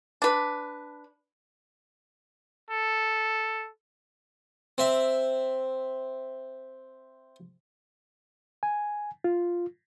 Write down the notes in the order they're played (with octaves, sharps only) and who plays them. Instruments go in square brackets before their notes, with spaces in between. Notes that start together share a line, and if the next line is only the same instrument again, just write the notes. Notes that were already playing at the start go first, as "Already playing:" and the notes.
[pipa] D4 B4
[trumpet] A4
[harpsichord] C4 E5
[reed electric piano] G#5
F4